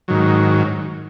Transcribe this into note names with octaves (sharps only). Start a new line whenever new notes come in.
G#2 D#3 F#3